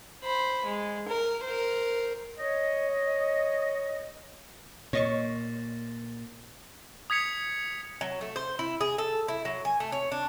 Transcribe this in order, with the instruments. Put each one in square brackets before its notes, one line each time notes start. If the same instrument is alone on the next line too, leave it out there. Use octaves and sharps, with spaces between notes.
[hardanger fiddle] C5 B5
G#3
A#4
A#4 C5
[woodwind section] C#5 D#5
[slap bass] A#2 [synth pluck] C#5 D#5 C#6
[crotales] D#6 G#6 B6 C#7 F7
[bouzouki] F#3
A3
C5
E4
G#4
A4
E4
F#3
G#5
A3
C#5
D4